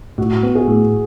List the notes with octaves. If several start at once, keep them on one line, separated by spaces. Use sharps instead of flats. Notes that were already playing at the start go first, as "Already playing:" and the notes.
A2 F#4
B3
G#4
A2